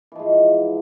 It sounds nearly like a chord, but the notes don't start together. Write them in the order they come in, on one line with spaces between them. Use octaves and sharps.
E3 F3 G#2